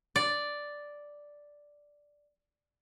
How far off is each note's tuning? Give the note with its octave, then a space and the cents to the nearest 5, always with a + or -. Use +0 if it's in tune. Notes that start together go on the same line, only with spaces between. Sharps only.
D5 +0